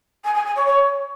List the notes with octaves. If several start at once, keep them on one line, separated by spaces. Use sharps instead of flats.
G#5
G#5
G#5
C#5
C#5